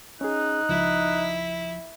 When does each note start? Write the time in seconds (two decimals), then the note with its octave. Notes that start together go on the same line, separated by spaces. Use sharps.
0.21 C#4 D#4 G#4 F#6
0.69 C#2 F3 E4